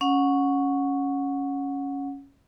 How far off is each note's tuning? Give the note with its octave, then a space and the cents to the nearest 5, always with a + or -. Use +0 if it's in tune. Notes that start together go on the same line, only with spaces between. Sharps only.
C#4 +0 F#5 -20